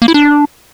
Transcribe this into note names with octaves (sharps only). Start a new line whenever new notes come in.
A#3
E4
D4